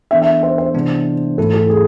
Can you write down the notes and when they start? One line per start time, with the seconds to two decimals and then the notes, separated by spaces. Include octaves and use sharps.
0.11 E3 B3 D4 A4 E5
0.22 E5
0.43 C5
0.58 C5
0.74 C3 E3 G#3 B3 D4
1.38 G#2 E3 A3 E4 A4
1.54 A4
1.70 G#4